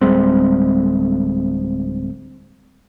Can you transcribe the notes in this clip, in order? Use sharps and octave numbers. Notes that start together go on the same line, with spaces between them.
D1 G3 G#3 C4